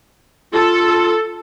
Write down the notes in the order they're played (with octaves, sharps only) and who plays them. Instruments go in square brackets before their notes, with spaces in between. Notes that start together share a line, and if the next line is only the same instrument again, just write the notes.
[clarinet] F4 [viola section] A4